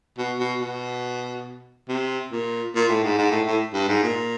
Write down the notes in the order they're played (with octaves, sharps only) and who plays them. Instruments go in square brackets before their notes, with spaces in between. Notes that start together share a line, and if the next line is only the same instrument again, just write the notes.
[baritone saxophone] B2
B2
B2
C3
A#2
A#2
A2
G#2
G#2
A2
A2
G2
G#2
A#2